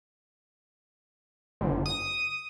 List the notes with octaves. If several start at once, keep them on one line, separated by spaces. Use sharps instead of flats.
G1
D#6